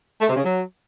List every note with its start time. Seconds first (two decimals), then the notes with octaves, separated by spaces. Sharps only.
0.21 A3
0.29 C3
0.37 C#3
0.44 F#3